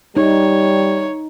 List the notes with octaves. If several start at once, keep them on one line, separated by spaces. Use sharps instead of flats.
G3 D#4 C#5